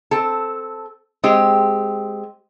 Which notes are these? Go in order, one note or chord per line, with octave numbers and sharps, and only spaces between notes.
C4 A4
G#3 C4 G4